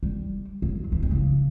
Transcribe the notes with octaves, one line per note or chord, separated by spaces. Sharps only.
G3
F#3
E3
D#3
C#3